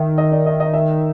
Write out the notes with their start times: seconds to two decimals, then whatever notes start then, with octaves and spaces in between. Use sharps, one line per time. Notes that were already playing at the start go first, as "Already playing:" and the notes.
Already playing: D#3 E5
0.18 D#5
0.32 D5
0.46 D#5
0.60 D#5
0.74 E5